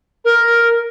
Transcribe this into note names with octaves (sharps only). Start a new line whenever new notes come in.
A#4